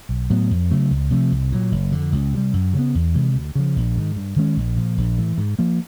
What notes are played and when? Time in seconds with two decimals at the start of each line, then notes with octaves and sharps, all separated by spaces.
0.09 B1
0.30 A2 F#3 B3
0.51 F2
0.71 C#3 F#3 A3
0.91 C#2
1.11 C3 F3 A3
1.32 C2
1.52 A#2 F#3
1.72 F#1
1.92 F2 D3
2.12 C#2
2.34 C3 D#3 G3
2.53 F#2
2.74 C#3 F#3
2.79 B3
2.95 E2
3.15 C3 E3 G#3
3.35 D2
3.55 C#3 F3
3.76 A#1
3.96 G#2 D#3
4.16 G2
4.36 D#3 G#3 C#4
4.57 A#1
4.77 A#2 F3
4.97 A#1
5.18 A2 E3
5.38 G#2
5.59 F3 A#3